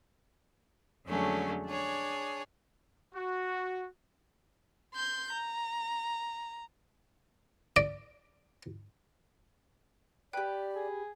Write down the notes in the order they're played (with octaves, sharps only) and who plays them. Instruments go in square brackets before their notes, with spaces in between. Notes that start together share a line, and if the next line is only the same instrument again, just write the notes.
[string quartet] F2 D3 F#3 G#3 A3 C#4
D4 G#4 C#5
[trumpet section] F#4
[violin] C6 G6
A#5
[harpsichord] D5
[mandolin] G4 B4 [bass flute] D5 [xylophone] G5 F#6
[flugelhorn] G#4